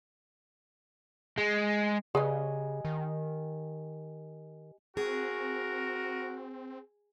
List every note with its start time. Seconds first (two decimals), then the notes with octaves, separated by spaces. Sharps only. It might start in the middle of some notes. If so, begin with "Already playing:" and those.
1.38 G#3
2.15 C#3 G4 G#4 B4 D5 D#5 G#5
2.85 D#3
4.97 C4 F#4 G#4 A#4